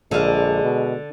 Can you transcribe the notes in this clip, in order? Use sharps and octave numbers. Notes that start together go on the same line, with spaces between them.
A#1 D3 G#3 F5
B2